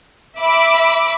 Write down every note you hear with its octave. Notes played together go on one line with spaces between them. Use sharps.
E5 B5 D6